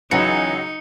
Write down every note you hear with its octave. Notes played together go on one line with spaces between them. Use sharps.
C#2 E3 F#3 D#4 C#7